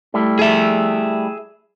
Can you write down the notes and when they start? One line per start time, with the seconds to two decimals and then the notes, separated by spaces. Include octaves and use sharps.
0.14 G3 A3 E4
0.39 G#4 E5